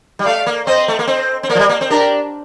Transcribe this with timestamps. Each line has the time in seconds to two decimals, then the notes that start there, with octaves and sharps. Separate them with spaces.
0.19 G3
0.25 A3 D5 F5
0.46 A#3
0.66 C4 C5 D#5
0.88 A3
0.99 A#3
1.07 C4 C5 D#5
1.43 C4
1.50 A#3 A#4 D5
1.55 F3
1.59 G3
1.69 A#3
1.81 C4
1.90 D4 G4 A#4